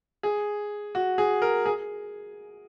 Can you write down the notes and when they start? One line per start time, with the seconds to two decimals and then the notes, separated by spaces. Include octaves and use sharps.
0.23 G#4
0.95 F#4
1.18 G#4
1.42 A#4
1.66 G#4